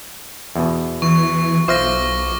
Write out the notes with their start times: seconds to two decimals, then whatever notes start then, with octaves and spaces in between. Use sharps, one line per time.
0.56 E2 B2
1.02 E3 C#6
1.68 B1 F4 C5 E5 D6 F6 A#6